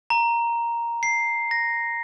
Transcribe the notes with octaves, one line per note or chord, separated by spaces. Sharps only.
A#5
C7
A#6